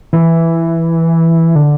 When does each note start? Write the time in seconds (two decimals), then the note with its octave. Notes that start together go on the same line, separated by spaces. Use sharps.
0.13 E3
1.55 D3